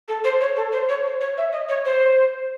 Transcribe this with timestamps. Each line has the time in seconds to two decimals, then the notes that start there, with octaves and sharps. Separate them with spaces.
0.08 A4
0.24 C5
0.41 C#5
0.56 A4
0.72 C5
0.89 C#5
1.05 C5
1.21 C#5
1.38 E5
1.52 D#5
1.69 C#5
1.85 C5